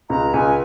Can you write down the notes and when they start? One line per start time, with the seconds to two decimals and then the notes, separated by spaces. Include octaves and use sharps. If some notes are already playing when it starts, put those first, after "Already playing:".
0.10 C#2 A#5
0.34 C#2 G#5